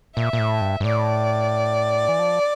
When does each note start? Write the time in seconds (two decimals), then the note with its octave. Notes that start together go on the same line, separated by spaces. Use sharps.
0.16 A#2 E5
0.33 A#2
0.39 A2
0.61 G2
0.80 G2
0.84 A2 D5
2.08 E3
2.19 F3